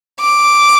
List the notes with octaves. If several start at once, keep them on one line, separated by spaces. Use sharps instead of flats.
D6